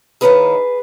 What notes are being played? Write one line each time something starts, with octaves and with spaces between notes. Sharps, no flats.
D#3 A#3 C#4 E4 G#4 B4